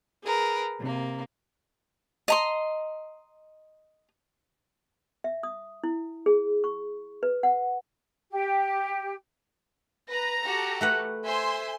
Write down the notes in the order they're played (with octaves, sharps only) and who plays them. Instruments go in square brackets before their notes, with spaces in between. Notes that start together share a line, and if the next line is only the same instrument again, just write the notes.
[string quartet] G#4 A#4 B4
C3 A#3
[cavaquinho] D#5 A#5 C6
[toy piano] E5
D#6
E4
G#4
C#6
B4
F#5
[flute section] G4
[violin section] B4 [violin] A#5 A#6
[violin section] F#4 G4 A4
[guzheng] A3 B4 F#5
[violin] C5 E5 [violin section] G#5 C6